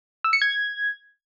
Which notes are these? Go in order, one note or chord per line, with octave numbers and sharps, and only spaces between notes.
E6
C#7
G#6